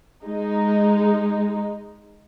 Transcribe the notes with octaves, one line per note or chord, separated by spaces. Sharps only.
G#3 D#4